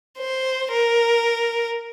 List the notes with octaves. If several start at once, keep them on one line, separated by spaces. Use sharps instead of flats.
C5
A#4